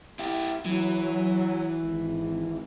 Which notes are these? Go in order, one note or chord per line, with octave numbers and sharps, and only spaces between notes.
E4 G4
E3 F#3
G#1